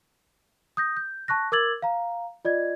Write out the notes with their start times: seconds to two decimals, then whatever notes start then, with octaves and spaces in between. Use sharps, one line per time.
0.77 D#6 G6 A#6
0.97 G6
1.28 A5 C#6 F#6 A#6
1.52 A#4 D6 E6 G#6 A6 F#7
1.82 F5 A#5
2.45 F4 D5 D#5 G#6